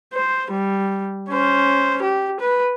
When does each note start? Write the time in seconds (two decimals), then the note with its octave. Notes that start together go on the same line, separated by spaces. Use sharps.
0.14 C5
0.51 G3
1.30 C#4 C5
2.02 G4
2.40 B4